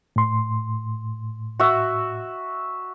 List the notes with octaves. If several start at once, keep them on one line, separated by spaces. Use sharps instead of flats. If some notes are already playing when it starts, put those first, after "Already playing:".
A2 C6
F#4 E5